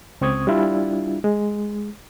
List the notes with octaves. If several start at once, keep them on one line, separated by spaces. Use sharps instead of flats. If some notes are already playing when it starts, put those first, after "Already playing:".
C#2 C4 C#6 D#6 G#6
G3 D4 E4 F4
G#3